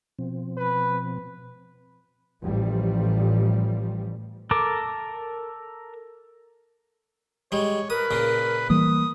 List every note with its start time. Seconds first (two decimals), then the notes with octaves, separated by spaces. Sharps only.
0.19 B2 F3 C4
0.57 B4
2.42 A1 F3 G3
4.51 A4 A#4 D6
7.52 G3 G#3 C#5
7.90 A#4 B4 D#6
8.11 A#2 C#3
8.70 E3 G3 A#3 D#6